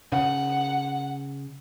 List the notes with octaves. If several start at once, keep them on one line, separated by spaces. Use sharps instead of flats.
C#3 F#5